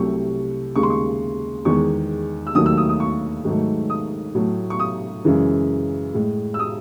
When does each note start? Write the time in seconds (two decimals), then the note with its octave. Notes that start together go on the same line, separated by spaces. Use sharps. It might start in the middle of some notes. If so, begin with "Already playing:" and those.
Already playing: C2 C3 F#3 A3 C#6
0.76 D#2 C#3 G#3 C#6
0.83 C6
0.90 C#6
1.65 E2 D#3 G#3 C#6
2.47 E6
2.55 D#2 D#3 F#3 A3 D#6
2.66 E6
2.77 D#6
2.89 D#6
3.00 C#6
3.45 G#2 D#3 F#3 A3
3.90 D#6
4.35 A2 F#3 A3
4.70 C#6
4.80 D#6
5.24 F#2 C#3 E3 G#3
6.14 A2 G#3
6.54 E6
6.59 D#6